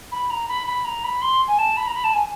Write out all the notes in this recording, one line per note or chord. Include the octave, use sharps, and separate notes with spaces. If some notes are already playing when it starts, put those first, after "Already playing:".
B5
A#5
B5
B5
A#5
B5
C6
G#5
A5
B5
A#5
B5
A5
G#5